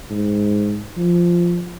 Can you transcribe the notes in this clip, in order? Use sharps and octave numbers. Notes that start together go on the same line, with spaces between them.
G#2
F3